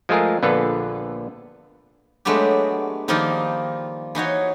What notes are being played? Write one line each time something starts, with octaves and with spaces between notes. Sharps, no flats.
F3 G#3 A3 F4 G#4 A#4
A#1 D3 B3 F4 A4 B4
F#3 G#3 A3 B3 D4 G4
D#3 F3 G3 A#3 D#4 F4
E3 D#4 F#4 C#5